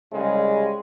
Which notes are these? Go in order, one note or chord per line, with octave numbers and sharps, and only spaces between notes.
C2 C#3 G3 G#3